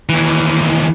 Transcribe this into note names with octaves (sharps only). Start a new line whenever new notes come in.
D#2 E3